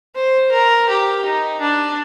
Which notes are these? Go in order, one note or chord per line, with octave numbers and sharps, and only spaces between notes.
C5
A#4
G4
D#4
D4